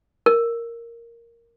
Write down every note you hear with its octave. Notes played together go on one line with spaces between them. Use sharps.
A#4